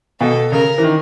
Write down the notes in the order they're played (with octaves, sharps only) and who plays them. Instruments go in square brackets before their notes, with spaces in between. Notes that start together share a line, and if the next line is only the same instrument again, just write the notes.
[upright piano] B2 [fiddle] A4
[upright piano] C#3 [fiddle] A#4
[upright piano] E3
D#3